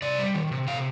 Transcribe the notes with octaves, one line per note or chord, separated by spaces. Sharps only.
C3 D5
G3
D#3
C3
C3 F5